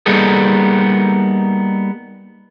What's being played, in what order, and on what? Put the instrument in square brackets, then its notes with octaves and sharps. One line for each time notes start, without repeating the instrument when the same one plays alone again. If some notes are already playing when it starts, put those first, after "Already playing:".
[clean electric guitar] G3 A#3 B3 D#4 G#4 A4